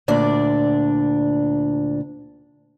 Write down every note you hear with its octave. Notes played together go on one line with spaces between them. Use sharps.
D2 A#2 D4 D5